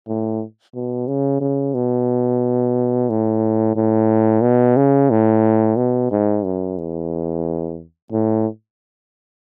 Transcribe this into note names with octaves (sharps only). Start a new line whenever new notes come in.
A2
B2
C#3
C#3
B2
A2
A2
B2
C#3
A2
B2
G#2
F#2
E2
A2